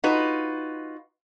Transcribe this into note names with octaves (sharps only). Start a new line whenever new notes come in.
D#4 F4 F#4 B4